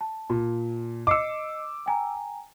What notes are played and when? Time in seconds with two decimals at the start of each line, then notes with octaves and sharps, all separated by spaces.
0.01 A5
0.30 A#2
1.07 D#5 D6 E6 C7 C#7
1.86 G5 G#5 A#5